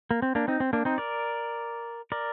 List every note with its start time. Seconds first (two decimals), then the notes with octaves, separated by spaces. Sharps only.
0.11 A#3
0.22 C4
0.35 A#3 D4
0.48 C4 D#4
0.60 C4
0.73 A#3 D4
0.85 C4 D#4
0.98 A#4 D5
2.12 A#4 D5